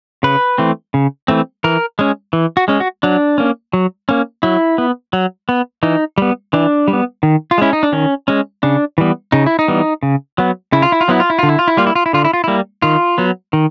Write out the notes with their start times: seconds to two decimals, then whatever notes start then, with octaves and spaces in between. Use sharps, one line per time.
0.23 C#3 B4
0.58 E3 A3 C4
0.94 C#3
1.28 E3 A3 C4
1.64 E3 A#4
1.99 G#3 C#4
2.33 E3
2.57 F#4
2.68 G#3 C#4
2.80 F#4
3.03 F#3 D4
3.38 A#3 C#4
3.73 F#3
4.09 A#3 C#4
4.43 F#3 E4
4.78 B3
5.13 F#3
5.49 B3
5.83 E3 D#4
6.18 G3 B3
6.53 E3 D4
6.88 G3
6.93 B3
7.23 D#3
7.51 F4
7.58 G#3 C#4 E4
7.73 D#4
7.83 D4
7.92 D#3 C#4
8.28 G#3 C#4
8.63 C#3 D4
8.98 E3 G3 B3
9.32 C#3 D#4
9.46 E4
9.59 D#4
9.68 E3 G3 B3
10.03 C#3
10.38 F#3 B3
10.72 C#3 E4
10.82 F4
10.92 E4
11.01 F4
11.08 F#3 B3 E4
11.20 F4
11.30 E4
11.39 D3 F4
11.49 E4
11.59 F4
11.68 E4
11.77 G3 A#3 F4
11.87 E4
11.95 F4
12.06 E4
12.13 D3 F4
12.25 E4
12.33 F4
12.44 G3 A#3 E4
12.82 D#3 F4
13.18 F#3 B3
13.53 D#3